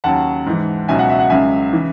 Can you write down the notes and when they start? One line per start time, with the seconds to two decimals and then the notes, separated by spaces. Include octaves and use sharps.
0.04 D#2 C#3 F#3 F#5 A5
0.46 G#2 E3
0.88 C#2 B2 F#3 E5 G#5
0.99 F#5
1.09 E5
1.19 F#5
1.30 C#2 C#3 F#3 E5 G#5
1.73 C#3 E3